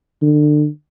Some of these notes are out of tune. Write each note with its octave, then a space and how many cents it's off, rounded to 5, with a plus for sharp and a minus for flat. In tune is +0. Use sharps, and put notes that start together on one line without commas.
D3 +30